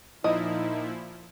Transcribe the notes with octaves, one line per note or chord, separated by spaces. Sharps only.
A#2 F3 D#4 E4 D#5